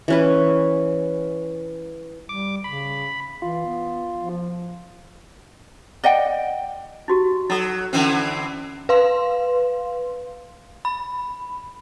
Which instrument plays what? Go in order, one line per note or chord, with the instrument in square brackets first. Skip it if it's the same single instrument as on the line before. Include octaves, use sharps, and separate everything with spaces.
[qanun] E3 C#4 B4
[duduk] G3 [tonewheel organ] D6
[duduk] C#3 [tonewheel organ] B5
[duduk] E3 [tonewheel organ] F4
[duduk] B3
F3
[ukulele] D5 D#5 F#5 G5
[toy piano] D#4 F#4 G4
[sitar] F#3 [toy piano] D#4 A4
[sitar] D3 E3 C4 [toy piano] C#4
[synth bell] B4 F5 C6
B5